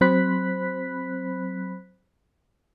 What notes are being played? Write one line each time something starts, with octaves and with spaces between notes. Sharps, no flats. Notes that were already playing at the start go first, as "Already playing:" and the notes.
F#3 C4 C5 B5 F#6 B6